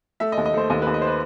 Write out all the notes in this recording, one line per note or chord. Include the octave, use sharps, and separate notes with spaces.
A3 E5
D#5
D#2
D#5
A3 C5
D#2 D#5
D#2 B4
D#5
C5
B4